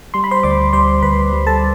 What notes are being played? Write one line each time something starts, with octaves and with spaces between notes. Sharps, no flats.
G3 C6
B5
C5 C6
D2 D5 D6
G3 C5 C6
D2 B4 B5
G3
A4 A5